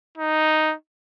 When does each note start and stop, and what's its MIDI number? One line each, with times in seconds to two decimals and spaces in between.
0.17 0.75 63